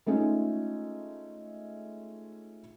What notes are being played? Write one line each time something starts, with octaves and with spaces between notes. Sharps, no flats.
G#3 A3 C#4 D#4 F4